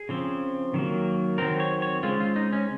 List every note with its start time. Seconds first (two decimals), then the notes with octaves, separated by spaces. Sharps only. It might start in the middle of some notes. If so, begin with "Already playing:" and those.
Already playing: G#4
0.09 C#3 F3 C4
0.74 D#3 F#3 A#3
1.38 D#3 F#3 C4 A#4
1.60 C#5
1.82 C#5
2.03 C#3 G#3 C4 F4
2.20 F4
2.36 D#4
2.53 C#4